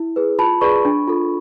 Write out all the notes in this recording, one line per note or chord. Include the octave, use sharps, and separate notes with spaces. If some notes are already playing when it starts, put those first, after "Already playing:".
Already playing: E4
G#4 B4
F4 A5 B5
G#4 B4 D5 B5 C#6
D4
F4 A4